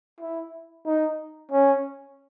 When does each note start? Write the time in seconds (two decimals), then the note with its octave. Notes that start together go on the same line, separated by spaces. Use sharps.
0.20 E4
0.86 D#4
1.52 C#4